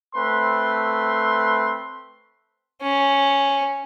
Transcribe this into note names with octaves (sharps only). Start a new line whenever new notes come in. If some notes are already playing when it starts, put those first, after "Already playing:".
A3 C4 B4 C6
C#4